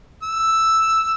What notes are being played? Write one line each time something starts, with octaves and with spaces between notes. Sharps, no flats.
E6